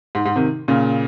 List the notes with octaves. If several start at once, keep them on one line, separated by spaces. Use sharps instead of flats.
G#2
G#2
C3 D#3
A#2 C#3